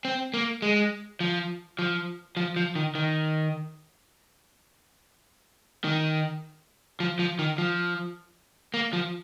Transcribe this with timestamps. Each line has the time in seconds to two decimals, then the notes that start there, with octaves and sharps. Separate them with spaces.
0.05 C4
0.34 A#3
0.62 G#3
1.20 F3
1.79 F3
2.37 F3
2.56 F3
2.75 D#3
2.95 D#3
5.84 D#3
7.00 F3
7.19 F3
7.39 D#3
7.58 F3
8.74 A#3
8.93 F3